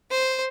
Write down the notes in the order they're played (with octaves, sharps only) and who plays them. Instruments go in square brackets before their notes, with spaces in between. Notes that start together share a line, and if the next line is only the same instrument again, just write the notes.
[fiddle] C5